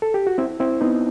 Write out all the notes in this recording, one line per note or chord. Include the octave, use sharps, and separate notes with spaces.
A4
G4
F#4
C4 E4
C4 E4
B3 D#4